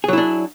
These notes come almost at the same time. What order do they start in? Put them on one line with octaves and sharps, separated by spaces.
G#4 F#3 E4 D4